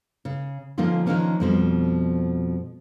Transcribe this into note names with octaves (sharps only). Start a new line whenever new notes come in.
C#3
D3 F3 A#3 C#4 D#4 F4
D#3 F3 A3 A#3 C#4 D4
F2 B2 F3 G3